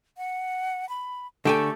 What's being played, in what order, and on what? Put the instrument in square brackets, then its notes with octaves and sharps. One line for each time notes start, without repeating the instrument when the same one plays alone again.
[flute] F#5
B5
[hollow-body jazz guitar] D3 G5 G#5 [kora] A3 G4 A4 [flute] C#6